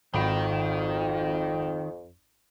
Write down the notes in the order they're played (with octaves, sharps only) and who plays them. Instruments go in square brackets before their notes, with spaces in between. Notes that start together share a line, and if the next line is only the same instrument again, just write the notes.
[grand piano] G#1 B5 D7 [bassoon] F2 [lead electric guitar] D#3